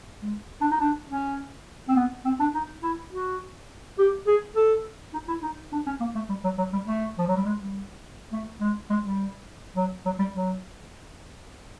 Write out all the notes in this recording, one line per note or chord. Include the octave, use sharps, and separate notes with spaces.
G#3
D4
D#4
D4
C#4
C4
B3
C4
D4
D#4
E4
F#4
G4
G#4
A4
D#4
E4
D#4
D4
C#4
A#3
A3
G3
F#3
F#3
G3
A3
F3
F#3
G3
G#3
G3
A3
G#3
G#3
G3
F#3
F#3
G3
F#3